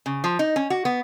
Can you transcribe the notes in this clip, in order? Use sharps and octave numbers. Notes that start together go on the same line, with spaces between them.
C#3
F3
D#4
C#4
F#4
B3